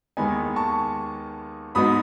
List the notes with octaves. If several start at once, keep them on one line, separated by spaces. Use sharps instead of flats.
D#2 D#3 G#3 B3 D#4 G#5 B5
A5 C#6
G#2 F#3 B3 D#4 B5 D#6